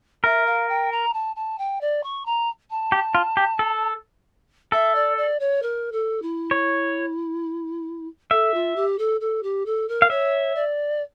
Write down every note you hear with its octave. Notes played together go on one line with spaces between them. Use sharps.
A#4 E5
F5
G5
A#5
A5
A5
G5
D5
C#6
A#5
A5
G4
F4
G4
A4
A4 E5
D5
D5
C#5
A#4
A4
E4
C#5
A4 E5
F4
G4
A4
A4
G4
A4
A#4
F5
C#5 E5
D5